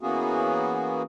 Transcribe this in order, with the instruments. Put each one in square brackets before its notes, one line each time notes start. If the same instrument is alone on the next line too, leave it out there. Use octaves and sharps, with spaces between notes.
[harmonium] E3 A#3 B3 C#4 F#4 G#4